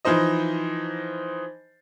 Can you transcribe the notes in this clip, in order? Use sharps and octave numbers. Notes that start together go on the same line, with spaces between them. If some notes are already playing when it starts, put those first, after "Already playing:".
E3 F3 D#4 C5 D#5